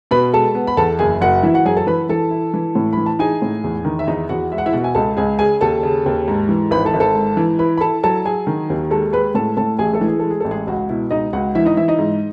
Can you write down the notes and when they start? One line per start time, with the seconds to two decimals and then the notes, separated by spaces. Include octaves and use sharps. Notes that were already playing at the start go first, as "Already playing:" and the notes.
0.11 B2 B4 B5
0.34 G#3 A4 A5
0.55 B3
0.67 B5
0.77 E2 A4 A5
0.99 F#1 G#4 G#5
1.21 F#1 F#4 F#5
1.43 E3 E4 E5
1.54 F#4 F#5
1.65 F#2 G#4 G#5
1.77 A4 A5
1.87 E3 B4 B5
2.09 E3 A4 A5
2.31 E4
2.54 E3
2.75 A2
2.93 E3 B5
3.06 A5
3.19 D#4 G#4 G#5
3.42 A2
3.64 E2
3.85 D#3
3.99 E5
4.07 E2 D#4 D#5
4.29 E2 F#4 F#5
4.52 G#3 E5
4.58 F#5
4.66 E4 E5
4.73 B2 F#4 F#5
4.84 G#5
4.95 C#2 A4 A5
5.17 C#2 G#4 G#5
5.39 C#3 G#4 G#5
5.61 D#2 A4 A5
5.83 C#3
6.06 D#2
6.28 G#2
6.49 E3
6.71 G#1 B4 B5
6.85 A4 A5
6.94 G#1
7.00 A4 A5
7.15 G#2
7.37 E3
7.59 E4 B4 B5
7.77 B5
7.81 E4 A4 A5
8.03 F#3 A4 A5
8.25 F#3 G#4 G#5
8.47 D#3
8.70 D#2
8.91 G#3 A4 A5
9.13 G#3 B4 B5
9.35 A2 A4 A5
9.57 A2 A4 A5
9.79 A1 G#4 G#5
9.93 A3 A4
10.01 E3
10.08 G#4
10.20 G#3 A4
10.31 G#4
10.40 A1 A4
10.51 G#3 G#4
10.67 C#2 F#4
10.89 B2 E4
11.11 C#2 D#4 D#5
11.33 C#2 F#4 F#5
11.55 E3 E4 E5
11.66 D#4 D#5
11.77 E3 E4 E5
11.88 D#4 D#5
11.99 G#2